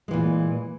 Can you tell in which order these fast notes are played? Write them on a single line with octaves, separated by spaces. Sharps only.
G#3 E3 A#2